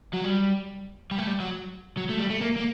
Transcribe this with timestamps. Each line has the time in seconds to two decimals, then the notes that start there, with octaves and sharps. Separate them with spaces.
0.13 F#3
0.24 G3
1.11 G3
1.18 A3
1.27 G3
1.40 F#3
1.97 F#3
2.09 A3
2.19 G3
2.30 A3
2.41 A#3
2.56 A#3